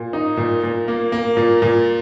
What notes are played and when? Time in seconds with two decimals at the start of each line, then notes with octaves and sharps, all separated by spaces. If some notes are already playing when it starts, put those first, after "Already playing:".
Already playing: A#2
0.13 D#4
0.37 A#2
0.63 A#2
0.88 A#3
1.12 A#3
1.37 A#2
1.62 A#2